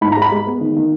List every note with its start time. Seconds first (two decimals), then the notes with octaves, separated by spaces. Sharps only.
0.01 G#2 B5
0.12 A#5
0.17 G#3
0.22 B5
0.32 G#3
0.47 B3
0.61 D#3
0.76 D#3